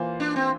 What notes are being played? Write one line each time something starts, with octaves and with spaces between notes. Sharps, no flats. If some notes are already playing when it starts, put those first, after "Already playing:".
Already playing: E3 A#3 F4 C5
D4
C4